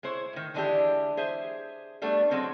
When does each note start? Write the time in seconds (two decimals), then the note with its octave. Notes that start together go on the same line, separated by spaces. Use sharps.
0.03 G#3 E4 C5 C#5
0.33 A2 D#3
0.54 D3 E3 G#3 D4 E4 G4
1.17 G#4 C5 E5
2.02 G3 A3 B3 D4
2.31 F#3 G#3 C4 C#4